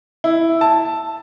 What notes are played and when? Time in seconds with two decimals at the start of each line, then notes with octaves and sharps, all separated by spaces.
0.24 E4
0.61 A5